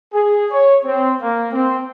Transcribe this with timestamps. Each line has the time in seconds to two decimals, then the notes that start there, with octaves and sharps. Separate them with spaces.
0.13 G#4
0.51 C#5
0.84 C4
1.21 A#3
1.52 C4